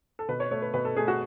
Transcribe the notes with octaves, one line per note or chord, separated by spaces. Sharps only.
A4
B2 B4
C#5
A3 C#5
B4
B2 B4
A4
A3 G#4
F#4